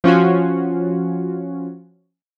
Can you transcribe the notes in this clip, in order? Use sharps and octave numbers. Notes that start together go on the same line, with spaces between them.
F3 C#4 F4 F#4